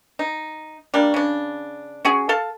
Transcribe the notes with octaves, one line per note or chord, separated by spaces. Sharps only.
D#4
G3 A#3 D4
C#3 D4
C#4 F#4 G#4
A4 F5 A5